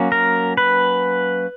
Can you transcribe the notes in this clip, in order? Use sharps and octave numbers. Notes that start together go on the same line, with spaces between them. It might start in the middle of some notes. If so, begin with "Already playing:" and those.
Already playing: F#3 A#3 C#4
A#4
B4